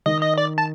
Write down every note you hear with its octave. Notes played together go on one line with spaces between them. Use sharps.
D#3 D#5
D#5
D5
A5